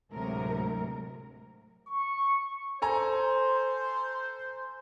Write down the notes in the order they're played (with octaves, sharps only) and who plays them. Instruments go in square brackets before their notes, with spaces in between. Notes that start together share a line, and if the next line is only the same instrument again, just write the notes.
[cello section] D2 A2 C3 F#3 G#3 A#4
[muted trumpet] C#6
[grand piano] A4 G#5 A#5 [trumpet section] C5